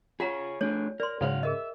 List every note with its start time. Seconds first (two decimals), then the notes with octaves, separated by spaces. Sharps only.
0.20 F4 G#4 C#5 F#5 A#5
0.61 A3 D4 G#4 C#5
1.00 A#4 D5 C6
1.21 G#2 C#3 F#3 F5 F#5
1.43 G#4 A#4 D#5 E5